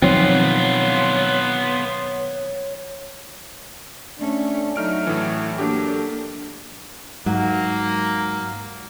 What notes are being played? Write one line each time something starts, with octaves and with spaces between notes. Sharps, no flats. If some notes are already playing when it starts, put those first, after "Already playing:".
B2 D#3 F3 F#3 B3 C4 F4 C#5
A3 C#4 D4
F#3 A3 D#4 F6 D7
A2 E3
F#3 A#3 D4 G4 A4
G#2 F#3 A#3